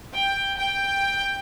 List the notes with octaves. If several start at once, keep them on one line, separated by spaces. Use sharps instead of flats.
G5
G5